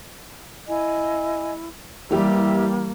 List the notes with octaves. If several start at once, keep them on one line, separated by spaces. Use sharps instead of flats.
E4 D#5 G#5
E3 G3 A#3 G4 E5